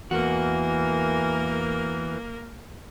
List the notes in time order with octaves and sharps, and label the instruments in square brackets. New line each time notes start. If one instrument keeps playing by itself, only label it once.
[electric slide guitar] E2 F#4 [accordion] E3 [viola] A#3 A#4